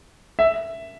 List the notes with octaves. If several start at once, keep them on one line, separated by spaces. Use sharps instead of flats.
E5